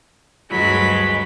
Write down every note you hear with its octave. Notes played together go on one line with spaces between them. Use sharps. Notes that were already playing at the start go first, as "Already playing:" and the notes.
D2 G2 F#3 G#3 B5